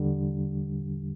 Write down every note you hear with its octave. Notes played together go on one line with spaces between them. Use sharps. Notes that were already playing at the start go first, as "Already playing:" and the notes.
Already playing: E2 D3 G3